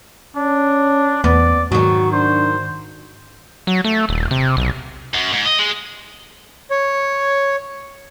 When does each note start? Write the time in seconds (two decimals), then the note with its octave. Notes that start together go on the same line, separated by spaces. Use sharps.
0.36 C#4 D4
1.24 E2 B3 D5
1.72 G#2 D#3 F#3 F#4 C#6
2.12 D4 C5
3.67 F#3
3.84 A3
4.09 D#1
4.31 C3
4.57 B1
5.15 F#2
5.34 G#2
5.46 D#5
5.60 G#3
6.71 C#5